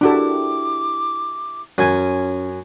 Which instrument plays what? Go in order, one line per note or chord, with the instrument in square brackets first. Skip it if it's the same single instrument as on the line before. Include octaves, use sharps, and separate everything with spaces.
[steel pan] D4 F#4 A4 [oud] E4 G4 A#4 [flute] D6
[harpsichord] F#2 G#5 [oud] C#4 F4 B4